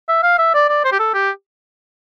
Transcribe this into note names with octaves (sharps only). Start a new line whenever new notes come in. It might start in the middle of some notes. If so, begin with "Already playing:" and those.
E5
F5
E5
D5
D5
C5
G4
A4
G4